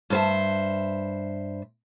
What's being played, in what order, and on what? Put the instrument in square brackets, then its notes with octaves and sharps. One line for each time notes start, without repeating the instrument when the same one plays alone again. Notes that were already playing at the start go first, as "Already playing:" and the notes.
[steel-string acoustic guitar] G2 C5 E5